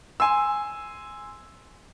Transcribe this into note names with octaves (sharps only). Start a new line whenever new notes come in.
G#5 C6 E6